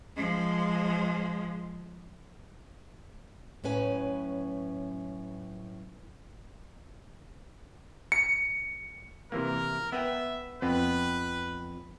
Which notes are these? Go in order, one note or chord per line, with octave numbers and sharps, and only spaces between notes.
F3 G#3
A2 F#3 C#4 B4 G#5
C#7
C3 E3 A#3 A#4
B3 B4 E5 G5
F2 B3 C4 B4